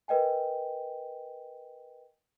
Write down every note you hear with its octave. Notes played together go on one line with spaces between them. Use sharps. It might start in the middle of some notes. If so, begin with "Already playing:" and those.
A#4 B4 D#5 G5 G#5